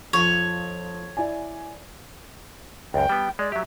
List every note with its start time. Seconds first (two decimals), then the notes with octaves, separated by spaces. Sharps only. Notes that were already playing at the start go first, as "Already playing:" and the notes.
0.13 F2 F4 C#5
1.17 E4 D5 G#5
2.94 C#2 F#2 G5
3.09 G3 B3
3.39 G#3 D5
3.52 F#3 G4 E5